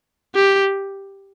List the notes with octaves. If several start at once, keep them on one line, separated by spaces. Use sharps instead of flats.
G4